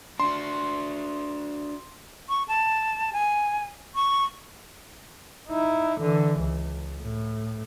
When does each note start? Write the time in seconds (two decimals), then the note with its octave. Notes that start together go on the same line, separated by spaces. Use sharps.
0.20 D4 F#4 C6
2.29 C#6
2.48 A5
3.13 G#5
3.95 C#6
5.49 D#4 E4
6.01 D3 E3
6.40 C#2
7.02 A2